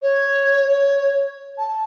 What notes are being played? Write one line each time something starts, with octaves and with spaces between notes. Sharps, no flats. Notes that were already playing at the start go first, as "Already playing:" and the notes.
C#5
C#5
A5